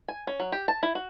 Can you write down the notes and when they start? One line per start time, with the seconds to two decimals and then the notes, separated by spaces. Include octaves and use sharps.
0.08 G#5
0.27 C#4
0.40 F#3
0.52 G4
0.68 A5
0.83 E4
0.95 F#4